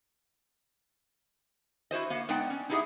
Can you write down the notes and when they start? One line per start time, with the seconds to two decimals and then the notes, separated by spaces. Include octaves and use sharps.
1.91 E4 F#4 C5 D#5
2.10 A#3 F5
2.29 G#3 B3 D#4 D5 F#5 G5
2.50 C#4
2.69 D#4 E4 G4 G#4 D#5 F#5